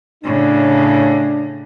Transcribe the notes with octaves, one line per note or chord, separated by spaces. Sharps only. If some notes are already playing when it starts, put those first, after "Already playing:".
A2 C#3 D4